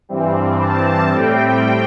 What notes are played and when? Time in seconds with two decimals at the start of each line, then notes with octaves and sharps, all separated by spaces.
0.09 G2 E3 G3 C4
0.60 A5
1.11 A2 G3 C4 G5